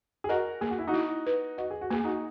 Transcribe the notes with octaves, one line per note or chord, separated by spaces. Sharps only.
G#4
F#4 A#4 D#5
A#3 G#4
F#4
E4
D#4 F#4
E4
B4
F#4 D#5
G#4
F#4
A#3 G#4
D#4 F#4